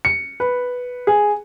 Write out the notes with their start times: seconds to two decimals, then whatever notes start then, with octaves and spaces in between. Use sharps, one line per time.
0.05 C#7
0.40 B4
1.07 G#4